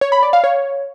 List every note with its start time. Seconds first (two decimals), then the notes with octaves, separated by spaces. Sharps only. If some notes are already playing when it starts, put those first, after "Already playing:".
0.01 C#5
0.12 B5
0.23 D5
0.33 F5
0.44 C#5